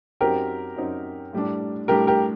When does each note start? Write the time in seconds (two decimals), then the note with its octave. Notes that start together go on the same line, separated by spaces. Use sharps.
0.21 F#2 F#3 C4 D#4 G4 A#4
0.76 F#2 F#3 C4 D#4
1.33 A2 G3 D4
1.88 A2 G3 D4 G4 A#4
2.07 G4 A#4